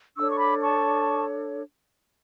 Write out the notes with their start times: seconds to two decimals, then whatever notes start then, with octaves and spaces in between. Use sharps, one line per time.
0.16 D4 A4 C#5 C#6 E6
0.29 C#6
0.38 B5 D6
0.61 A5 C#6